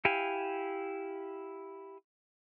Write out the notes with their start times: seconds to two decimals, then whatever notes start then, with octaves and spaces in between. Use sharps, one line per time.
0.05 E4 G4 F5 G#5